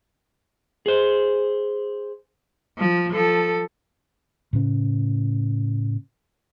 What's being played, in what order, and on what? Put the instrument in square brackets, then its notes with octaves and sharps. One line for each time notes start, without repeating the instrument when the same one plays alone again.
[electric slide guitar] G#4 C5
[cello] F3
F3 A4
[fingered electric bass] A2 C#3 C#4